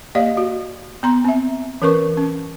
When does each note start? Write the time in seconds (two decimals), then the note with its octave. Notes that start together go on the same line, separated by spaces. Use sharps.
0.15 A#3 G4 D5 D#5 F5
0.37 F#4
1.03 B3 A#5 C6
1.25 C4 E5
1.82 E3 C#4 A#4 B4 C#6
2.17 C#4